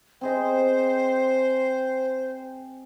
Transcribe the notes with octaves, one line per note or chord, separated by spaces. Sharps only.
C4 G#4 C5 D#5